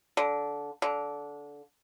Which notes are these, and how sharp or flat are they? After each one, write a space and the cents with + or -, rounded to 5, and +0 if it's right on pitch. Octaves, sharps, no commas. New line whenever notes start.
D3 -20
D3 -20